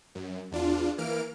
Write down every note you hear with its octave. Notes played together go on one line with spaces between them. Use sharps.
F#2
E2 D4 F4
E3 A#3 F6 D7